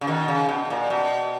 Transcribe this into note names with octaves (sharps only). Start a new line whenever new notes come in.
C#3
B2 D#3
C#3
B2
A#2
B2